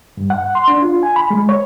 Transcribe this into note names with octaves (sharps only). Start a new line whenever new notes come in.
G2
F#5
C6
D4
F4
G#5
B5
G#3
C#5